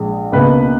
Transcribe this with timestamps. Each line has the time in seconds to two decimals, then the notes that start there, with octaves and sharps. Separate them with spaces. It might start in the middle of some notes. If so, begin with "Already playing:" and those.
Already playing: A#1 A#2 G#3
0.32 C#2 B2 A#3 B4